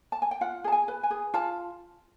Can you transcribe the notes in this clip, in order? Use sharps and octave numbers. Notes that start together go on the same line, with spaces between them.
A5
G#5
G5
F4 F#5
G#4 A5
G#5
B4
G#5
G#4
F4 A5